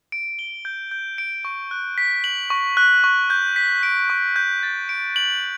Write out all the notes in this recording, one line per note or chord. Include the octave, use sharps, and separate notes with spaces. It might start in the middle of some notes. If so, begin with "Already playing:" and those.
D7
G7
G6
G6
D7
C#6
F#6
B6
F#7
C#6
F#6
C#6
G6
B6
D7
C#6
G6
A6
D7
F#7